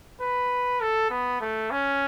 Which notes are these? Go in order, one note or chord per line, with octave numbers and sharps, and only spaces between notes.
B4
A4
B3
A3
C#4